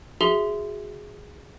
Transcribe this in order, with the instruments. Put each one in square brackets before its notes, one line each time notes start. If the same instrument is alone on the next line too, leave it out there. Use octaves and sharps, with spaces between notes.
[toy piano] F#4 [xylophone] G#4 E5 G7